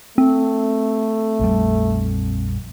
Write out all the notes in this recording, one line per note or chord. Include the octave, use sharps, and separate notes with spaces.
A3 C4
A#1 F2 G3